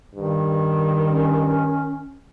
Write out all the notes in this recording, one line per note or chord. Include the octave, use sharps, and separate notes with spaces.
G2 D#3
C#4